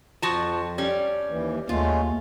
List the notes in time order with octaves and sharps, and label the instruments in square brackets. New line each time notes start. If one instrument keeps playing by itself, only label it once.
[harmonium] F2 [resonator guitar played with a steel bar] F3 F#4 A5
[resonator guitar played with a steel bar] G3 C#4
[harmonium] D#2 E3
[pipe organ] D#2 [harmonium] G#3 A3 C#4 [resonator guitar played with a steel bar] F4